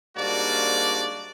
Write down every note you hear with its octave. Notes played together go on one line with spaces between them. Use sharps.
G#2 G3 A#3 D4 F#4 D5